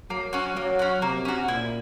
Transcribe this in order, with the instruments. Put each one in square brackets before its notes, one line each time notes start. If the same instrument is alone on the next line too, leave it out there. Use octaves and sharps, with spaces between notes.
[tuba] F#3 [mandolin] A#3
[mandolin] C#4 F#4
[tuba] F#3 [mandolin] A#3
[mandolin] C#4 F#4
[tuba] C3 [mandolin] A#3
[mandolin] C#4 F#4
[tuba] A#2 [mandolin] E4